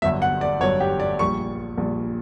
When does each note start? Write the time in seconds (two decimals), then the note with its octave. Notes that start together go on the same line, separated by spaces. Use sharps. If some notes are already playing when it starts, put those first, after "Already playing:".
0.02 G1 G2 F#3 E5
0.22 F#5
0.41 D5
0.61 G1 G2 F#3 C#5
0.80 G4
1.00 D5
1.19 A#1 A#2 G3 C#6
1.77 A#1 A#2 G3